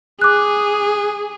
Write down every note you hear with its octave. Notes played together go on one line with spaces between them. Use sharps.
G#4 D6 F#6